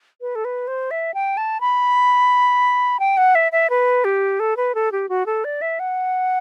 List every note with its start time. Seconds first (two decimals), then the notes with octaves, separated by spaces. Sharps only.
0.21 B4
0.35 A4
0.45 B4
0.67 C5
0.91 E5
1.14 G5
1.37 A5
1.60 B5
3.00 G5
3.17 F#5
3.35 E5
3.52 E5
3.70 B4
4.04 G4
4.40 A4
4.57 B4
4.75 A4
4.92 G4
5.09 F#4
5.26 A4
5.44 D5
5.62 E5
5.79 F#5